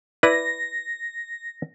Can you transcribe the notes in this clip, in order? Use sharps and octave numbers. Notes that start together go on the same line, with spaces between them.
E4 B4 D5 A#6